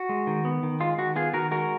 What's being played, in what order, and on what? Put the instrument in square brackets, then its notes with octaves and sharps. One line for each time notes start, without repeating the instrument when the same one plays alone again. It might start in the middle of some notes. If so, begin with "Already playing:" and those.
Already playing: [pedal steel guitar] F#4
G#3
D#3
B3
D#3
G#3 F4
D#3 F#4
B3 F4 G#4
D#3 F#4 A#4
G#3 F#4 A#4